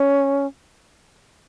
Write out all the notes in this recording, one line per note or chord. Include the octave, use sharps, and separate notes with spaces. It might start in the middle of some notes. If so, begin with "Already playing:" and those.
Already playing: C#4